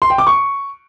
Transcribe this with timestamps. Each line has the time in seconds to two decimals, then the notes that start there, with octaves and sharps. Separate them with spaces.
0.02 C6
0.10 G5
0.18 D6
0.27 C#6